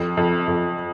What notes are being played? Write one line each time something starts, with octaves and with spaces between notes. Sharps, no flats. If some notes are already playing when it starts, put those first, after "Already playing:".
Already playing: F2
F2
F2